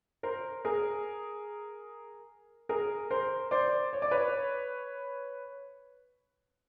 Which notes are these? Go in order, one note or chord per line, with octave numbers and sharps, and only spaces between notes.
A#4 C5
G#4 A#4
G#4 A#4
A#4 C5
C5 D5
C#5
D5
B4 C#5